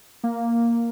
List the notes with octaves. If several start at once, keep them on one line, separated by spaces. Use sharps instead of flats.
A#3